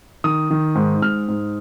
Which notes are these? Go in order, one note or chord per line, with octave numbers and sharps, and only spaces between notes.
D#3 D#6
D#3
G#2
G#2 F6
G#2